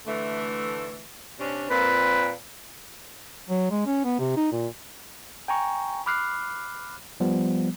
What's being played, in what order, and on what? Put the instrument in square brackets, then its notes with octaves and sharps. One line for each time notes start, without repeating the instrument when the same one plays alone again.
[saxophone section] D3 E3 A3
C3 C#4 D4
[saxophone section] A#2 C4 [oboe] B4
[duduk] F#3
G#3
C#4
B3
C3
D#4
A#2
[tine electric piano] G5 G#5 A#5 C#6
B5 D6 F6 F#6 C7
F3 G3 B3